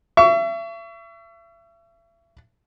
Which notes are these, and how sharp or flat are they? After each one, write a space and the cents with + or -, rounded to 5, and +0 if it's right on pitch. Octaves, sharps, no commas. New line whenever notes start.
E5 +35 C#6 +30